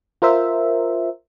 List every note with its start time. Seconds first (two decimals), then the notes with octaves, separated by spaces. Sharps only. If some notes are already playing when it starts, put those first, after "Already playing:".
0.22 F4 A#4 C5 E5